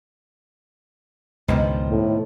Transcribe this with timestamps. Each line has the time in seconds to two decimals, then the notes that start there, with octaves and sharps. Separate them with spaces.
1.48 C#2 G2 B2 D#3 F3
1.88 A2